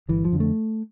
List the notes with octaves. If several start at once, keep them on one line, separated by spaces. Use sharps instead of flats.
G1 E3
F3
F2 D3
A3